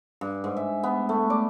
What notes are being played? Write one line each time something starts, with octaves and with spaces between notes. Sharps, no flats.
G2
G#2
E5
B3
A3
D5